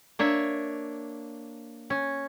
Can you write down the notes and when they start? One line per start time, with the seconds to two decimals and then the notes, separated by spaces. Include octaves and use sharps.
0.19 A#3 D4 C#5 E5
1.90 C#4